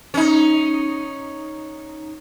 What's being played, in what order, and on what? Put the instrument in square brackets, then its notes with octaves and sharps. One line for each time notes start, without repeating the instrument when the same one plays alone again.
[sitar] C#4 D#4